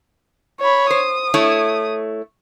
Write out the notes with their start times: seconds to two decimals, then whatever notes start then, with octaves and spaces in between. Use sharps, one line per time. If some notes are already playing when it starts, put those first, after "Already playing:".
0.61 C#5 B5
0.90 C5 D#6
1.34 A3 E4 C#5